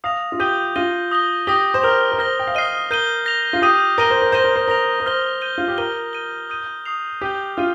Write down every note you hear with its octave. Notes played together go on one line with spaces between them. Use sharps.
F5 D#6 A#6 F7
F4
G4 D#6 G6 D#7 G7
F4 A#6 D#7 G7
D#6 A#6 G7
G4 D#6 A#6 G7
C5
A#4 F6 A#6 F7
A#4
C5 F6 A#6 G7
G5
F5
D#5 F6 C7 D#7 G7
A#4 G6 D#7 G7
A#6 F7
F4
G4 D#6 G6 D#7
A#4 A#6 D#7 G7
C5
A#4
C5 A#6 D#7 G7
A#4
C5
A#4 A#6 F7
A#4
C5 F6 A#6 G7
G6 D#7 G7
F4
G4
A#4 G6 D#7 G7
G6 D#7 G7
D#6 G6 D#7
D#6 C7 F7
G4 G6 D#7 G7
F4 F6 D#7